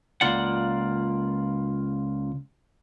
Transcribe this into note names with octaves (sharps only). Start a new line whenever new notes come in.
C#2 A#3 F4 D5 F#5